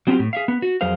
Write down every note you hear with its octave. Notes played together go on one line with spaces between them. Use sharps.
F#3 B3 C4 E4 F4 G4
A2
G#4 E5 F5
B3
F#4
F2 F#3 G#4 A#4 C5 F5